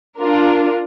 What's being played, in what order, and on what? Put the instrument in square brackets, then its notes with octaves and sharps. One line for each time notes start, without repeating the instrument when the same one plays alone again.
[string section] D4 F4 A#4